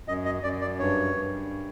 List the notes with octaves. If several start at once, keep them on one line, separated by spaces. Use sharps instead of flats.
F#2 D#5
D#5
F#2 D5
D5
G2 C#5
G2